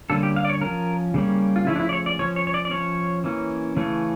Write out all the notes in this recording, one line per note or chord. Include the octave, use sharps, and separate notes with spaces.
D3 G3 A#3 C#4 A4
G4
F5
D5
C#5
F3 C#4 A#4
C#3 G3 A#3 C#4
F4
C#3 F3 A3 C#4 E4
D4
E4
D5
C#5
D5
F3 C#4 C#5
C#5
C#5
D5
D5
F3 C#4 C#5
E3 A#3 C#4
C#3 E3 A3 C#4